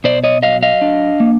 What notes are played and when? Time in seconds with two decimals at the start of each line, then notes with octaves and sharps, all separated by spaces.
0.04 B2 C5 D5
0.24 C#5 D#5
0.43 F#3 D#5 F5
0.63 D#5 F5
0.81 D4
1.20 A#3